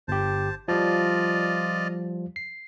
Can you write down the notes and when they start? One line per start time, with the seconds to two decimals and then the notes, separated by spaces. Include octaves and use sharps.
0.08 G1 G4 C5 A5
0.68 F3 G3 F4 D5 D#5
2.36 C7